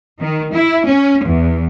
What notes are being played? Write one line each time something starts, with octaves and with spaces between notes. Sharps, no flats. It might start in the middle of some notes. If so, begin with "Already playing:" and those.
D#3
E4
C#4
E2